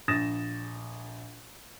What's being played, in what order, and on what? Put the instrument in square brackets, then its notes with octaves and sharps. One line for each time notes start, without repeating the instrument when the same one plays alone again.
[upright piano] A#1 D#6 A6 A#6 E7